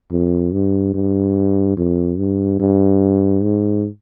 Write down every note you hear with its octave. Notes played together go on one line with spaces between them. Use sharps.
F2
G2
G2
F2
G2
G2
G#2